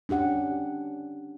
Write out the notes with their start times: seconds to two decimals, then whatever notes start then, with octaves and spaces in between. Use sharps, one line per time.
0.09 C#4 D4 G4 F#5